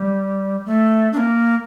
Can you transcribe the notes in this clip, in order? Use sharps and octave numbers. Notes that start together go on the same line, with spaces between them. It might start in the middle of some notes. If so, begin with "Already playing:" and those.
Already playing: G3
A3
D4
A#3